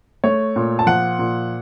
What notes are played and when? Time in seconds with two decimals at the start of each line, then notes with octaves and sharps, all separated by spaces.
0.24 A3 C#5
0.56 A#2
0.79 A5
0.86 F3 F#5
1.19 A#2